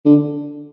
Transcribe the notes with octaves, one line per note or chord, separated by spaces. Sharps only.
D3